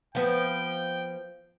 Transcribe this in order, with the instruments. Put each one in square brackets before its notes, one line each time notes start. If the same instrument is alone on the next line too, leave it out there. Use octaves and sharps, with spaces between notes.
[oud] F3 B3 [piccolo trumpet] G5